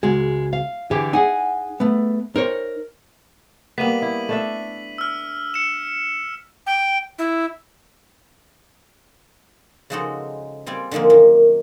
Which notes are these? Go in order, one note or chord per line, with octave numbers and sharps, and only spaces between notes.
C#2 G#3 F#4 G#4
F5
D3 E3 G4 G#4
D#4 G#4 F#5 G#5
A3 B3
D#4 A#4 C5 C#5
G3 A#3 B3 B6 D#7 F#7
E4
A3 D4 E5
E6 F6
C#7 E7
G5
E4
C#3 F3 G#3 D#4 F#4 A4
G3 C4 F4 D5 G#5
D3 D#3 F3 G#3 A#3
F#2 D#3